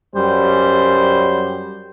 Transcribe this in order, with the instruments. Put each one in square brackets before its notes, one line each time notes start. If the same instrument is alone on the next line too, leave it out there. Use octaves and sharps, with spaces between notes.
[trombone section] F#2 G3 [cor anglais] C5